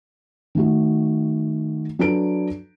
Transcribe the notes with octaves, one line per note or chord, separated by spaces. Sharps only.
D#3 A3 F#4
F#3 D4 A4 B4 D7